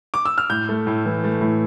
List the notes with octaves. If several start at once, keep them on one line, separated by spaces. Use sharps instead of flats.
D6
E6
F6
A2 G6
A3
A2
E3
A3
A2